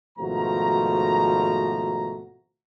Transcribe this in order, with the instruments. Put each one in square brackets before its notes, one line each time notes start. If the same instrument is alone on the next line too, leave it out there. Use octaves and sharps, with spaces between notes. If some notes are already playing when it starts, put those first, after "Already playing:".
[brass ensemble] G#1 B2 F3 A3 F#4 A#5